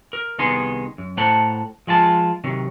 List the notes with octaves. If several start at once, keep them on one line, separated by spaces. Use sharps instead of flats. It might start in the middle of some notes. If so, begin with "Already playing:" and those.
A#4
C2 D#3 B3 D#4 G#4 C6
F#2
A2 A3 C5 F#5 A5 A#5
F3 G#3 F4 A5
C3 D#3 F#3